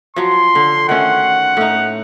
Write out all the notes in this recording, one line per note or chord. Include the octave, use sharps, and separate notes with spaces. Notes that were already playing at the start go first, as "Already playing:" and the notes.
F3 F#3 C6
D3
D#3 A3 C#4 F#5
A2 D#4